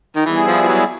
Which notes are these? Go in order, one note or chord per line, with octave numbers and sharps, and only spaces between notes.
D#3
E3 G3 B3 E4 G#4
F3
F3
F#3